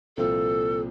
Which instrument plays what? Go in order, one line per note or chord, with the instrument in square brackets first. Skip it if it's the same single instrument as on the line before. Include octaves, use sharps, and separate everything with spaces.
[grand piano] C2 A#2 F3 C4 F4 [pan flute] A4